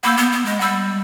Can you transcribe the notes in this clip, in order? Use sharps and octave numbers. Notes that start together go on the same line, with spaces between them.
A#3 F#5 B5 E6 G6
B3
B3
G#3
G3 F#5 B5 E6 G6